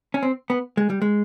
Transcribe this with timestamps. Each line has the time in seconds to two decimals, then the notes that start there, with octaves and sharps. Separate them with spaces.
0.14 C#4
0.23 C4
0.50 B3
0.77 G#3
0.90 G3
1.02 G#3